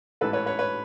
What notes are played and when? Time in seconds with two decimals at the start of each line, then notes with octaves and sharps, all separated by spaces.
0.21 A1 G#2 E3 A4 B4
0.33 B4 C#5
0.46 B4 C#5
0.59 B4 C#5